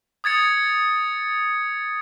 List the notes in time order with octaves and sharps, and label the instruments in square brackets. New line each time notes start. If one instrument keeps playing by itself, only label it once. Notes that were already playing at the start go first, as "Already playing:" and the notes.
[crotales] D#6 G#6 A6 C#7